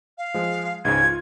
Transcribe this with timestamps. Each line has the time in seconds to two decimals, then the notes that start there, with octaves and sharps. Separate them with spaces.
0.18 F5
0.34 F3 G#3
0.85 C#2 G#2 C#3 G#6
1.03 F4